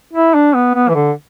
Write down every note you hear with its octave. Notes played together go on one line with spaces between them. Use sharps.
E4
D4
B3
B3
E3
D3